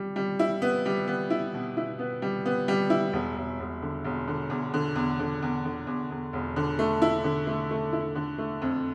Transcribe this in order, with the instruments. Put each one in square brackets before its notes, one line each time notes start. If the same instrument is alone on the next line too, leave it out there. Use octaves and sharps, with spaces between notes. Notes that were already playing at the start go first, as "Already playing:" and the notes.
Already playing: [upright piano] G3
G3
E4
B3
G3
B3
E4
B2
E4
B3
G3
B3
G3
E4
E1
E1
E1
D3
E1
D3
E2
D3
E2
D3
E2
D3
E2
E2
E1
D3
A3
E4
D3
A3
A3
E4
D3
A3
F2